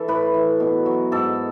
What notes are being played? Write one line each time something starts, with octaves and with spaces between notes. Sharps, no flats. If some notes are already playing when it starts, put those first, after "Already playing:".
Already playing: E3 A4
A2 B4
E3
B2
F#3
G#2 A4